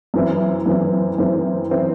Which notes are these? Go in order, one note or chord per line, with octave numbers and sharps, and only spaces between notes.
F#2 E3 C4 E4
F#2 E3 C4 E4
F#2 E3 C4 E4
E3 C4 E4